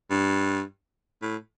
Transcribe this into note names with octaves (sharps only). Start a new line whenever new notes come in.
G2
A2